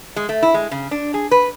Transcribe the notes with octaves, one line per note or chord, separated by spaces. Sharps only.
G#3
A3
E4
G#3
C#3
D4
G#4
B4